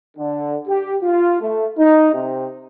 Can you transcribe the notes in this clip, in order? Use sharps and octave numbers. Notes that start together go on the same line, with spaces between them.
D3
G4
F4
A3
D#4
C3